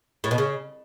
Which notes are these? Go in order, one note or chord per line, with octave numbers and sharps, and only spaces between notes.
A2
B2
C#3